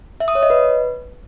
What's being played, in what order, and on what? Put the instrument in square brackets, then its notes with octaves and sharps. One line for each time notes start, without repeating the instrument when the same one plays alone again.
[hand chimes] E5
D#6
C#5
D#5
B4